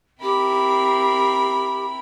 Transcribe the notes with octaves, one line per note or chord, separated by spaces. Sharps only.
C4 E4 G4 A#4 B5